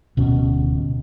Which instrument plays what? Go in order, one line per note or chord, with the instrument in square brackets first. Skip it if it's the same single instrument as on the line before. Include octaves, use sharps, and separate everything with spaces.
[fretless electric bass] D1 B2 C#4